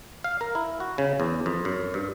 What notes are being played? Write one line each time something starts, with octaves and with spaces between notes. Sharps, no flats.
F5
A#4
E4
F#4
C#3
E2
F2
F#2
G2